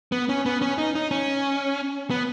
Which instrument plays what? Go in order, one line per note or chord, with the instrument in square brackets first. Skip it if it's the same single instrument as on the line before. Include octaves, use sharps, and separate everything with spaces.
[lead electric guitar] B3
C#4
B3
C#4
D#4
D#4
C#4
B3